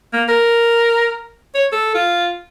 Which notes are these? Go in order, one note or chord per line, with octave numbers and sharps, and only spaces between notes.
A#3
A#4
C#5
A4
F4